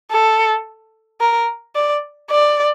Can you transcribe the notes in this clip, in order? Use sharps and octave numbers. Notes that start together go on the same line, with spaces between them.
A4
A#4
D5
D5